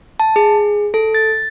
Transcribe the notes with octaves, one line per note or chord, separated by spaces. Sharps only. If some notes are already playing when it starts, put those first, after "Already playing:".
A5
G#4
A4
A6